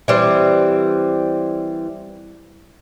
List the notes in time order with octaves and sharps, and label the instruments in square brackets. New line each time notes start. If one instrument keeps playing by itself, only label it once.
[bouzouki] E3 G3 C4